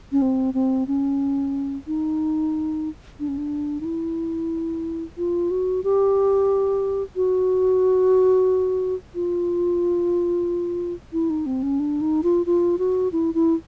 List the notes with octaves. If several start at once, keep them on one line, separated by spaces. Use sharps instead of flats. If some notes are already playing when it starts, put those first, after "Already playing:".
C#4
C4
C4
C#4
D#4
D4
C#4
D4
D#4
E4
F4
F#4
G4
F#4
F4
E4
D#4
C4
C#4
D4
D#4
F4
F4
F#4
E4
E4